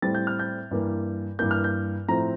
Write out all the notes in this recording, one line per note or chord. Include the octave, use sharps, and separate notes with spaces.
A2 G3 C4 A6
G6
F6
G6
G2 E3 A#3
G2 E3 A#3 G6
F6
G6
A2 F3 C4 E4 A#5